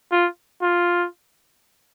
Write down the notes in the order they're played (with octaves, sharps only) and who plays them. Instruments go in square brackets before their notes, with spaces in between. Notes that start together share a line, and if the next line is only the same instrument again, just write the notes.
[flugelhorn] F4
F4